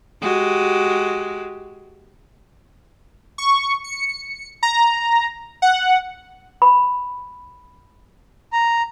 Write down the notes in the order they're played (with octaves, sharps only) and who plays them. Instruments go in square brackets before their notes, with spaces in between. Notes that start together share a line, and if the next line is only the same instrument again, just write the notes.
[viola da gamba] G#3 F#4 G4
[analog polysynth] C#6
C#7
A#5
F#5
[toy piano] B5
[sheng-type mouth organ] A#5